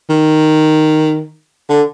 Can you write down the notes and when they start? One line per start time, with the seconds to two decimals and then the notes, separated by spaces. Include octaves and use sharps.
0.10 D#3
1.70 D3